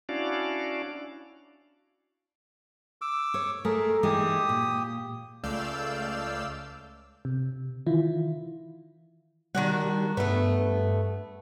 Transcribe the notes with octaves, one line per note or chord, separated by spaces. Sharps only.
C#4 D4 E4 F#4 D5 F5
D6 E6
C#5
A3 G#4 A#4
E3 G#3 D#4 G4 D#6
A#2
C#2 A3 D5 F5 E6 G6
C3
D#3 E3 E4 F4
D#3 G3 D4 F#4
G2 A3 B3